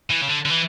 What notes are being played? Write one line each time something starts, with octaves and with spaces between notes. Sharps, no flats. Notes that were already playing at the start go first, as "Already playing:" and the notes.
E3
C#3
D3
D3
E3